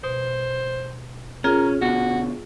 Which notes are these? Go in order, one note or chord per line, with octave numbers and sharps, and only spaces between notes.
B2 C5
C#4 F4 G#4 A#4
B2 D3 F#4